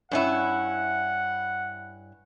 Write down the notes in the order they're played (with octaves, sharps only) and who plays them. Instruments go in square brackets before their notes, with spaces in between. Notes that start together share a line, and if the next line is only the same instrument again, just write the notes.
[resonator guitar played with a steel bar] G2 C#4 E4 [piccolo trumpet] F#5